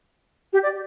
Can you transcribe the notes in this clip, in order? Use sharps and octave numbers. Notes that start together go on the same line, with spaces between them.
G4
D5